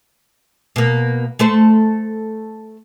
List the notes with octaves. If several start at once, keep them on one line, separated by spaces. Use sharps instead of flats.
B2 A#3
A3 A4 C5